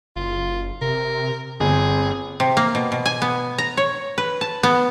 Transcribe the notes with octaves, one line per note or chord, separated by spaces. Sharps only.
F#1 F4
C3 A#4
G1 C4 G#4
C3
A#3
B2
B2
G#5
B3
A#5
C#5
B4
A5
B3